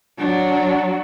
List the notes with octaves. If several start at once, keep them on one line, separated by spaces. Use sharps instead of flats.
F#3 D4